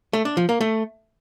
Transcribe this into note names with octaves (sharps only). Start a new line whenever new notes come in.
A3
D4
F3
A#3
A3